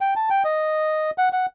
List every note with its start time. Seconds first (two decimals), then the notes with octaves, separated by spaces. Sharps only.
0.01 G5
0.16 A5
0.30 G5
0.45 D#5
1.18 F#5
1.33 F#5